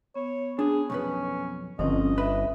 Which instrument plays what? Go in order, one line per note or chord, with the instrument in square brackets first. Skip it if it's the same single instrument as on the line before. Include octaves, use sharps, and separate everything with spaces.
[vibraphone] B3 [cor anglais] C#5
[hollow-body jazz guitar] D4 [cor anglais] G#4
[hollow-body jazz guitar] B1 F2 B4 [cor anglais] C#4
[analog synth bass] G1 [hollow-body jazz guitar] F3 [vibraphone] C4 C#4 [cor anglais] D#5
[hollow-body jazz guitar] B4 B5 [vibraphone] E5